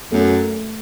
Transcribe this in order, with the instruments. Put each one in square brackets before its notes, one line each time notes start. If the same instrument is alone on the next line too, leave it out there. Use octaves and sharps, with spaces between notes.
[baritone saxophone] F#2 [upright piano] A3